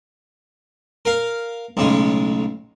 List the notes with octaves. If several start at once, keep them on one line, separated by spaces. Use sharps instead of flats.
A#4 F5
B1 A2 C#3 G#3